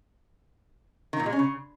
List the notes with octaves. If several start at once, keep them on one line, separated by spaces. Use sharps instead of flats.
D#3
A#2
G#3
C#4
C#3